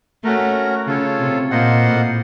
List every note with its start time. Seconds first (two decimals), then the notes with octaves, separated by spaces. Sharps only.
0.24 A3 C#4 F#4 A#4
0.87 C#3 F4 A4 C#5
1.19 C3
1.51 A#2 A#3 F4 C5 D#5 F#5
1.83 A2